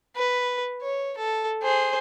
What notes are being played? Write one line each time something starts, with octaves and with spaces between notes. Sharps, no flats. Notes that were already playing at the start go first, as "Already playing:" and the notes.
B4
C#5
A4
G#4 C5